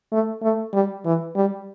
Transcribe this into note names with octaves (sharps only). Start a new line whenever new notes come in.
A3
A3
G3
E3
G3